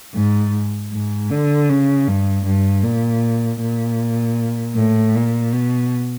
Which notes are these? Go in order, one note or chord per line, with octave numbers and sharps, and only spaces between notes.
G#2
G#2
D3
C#3
G2
G2
A#2
A#2
A2
A#2
B2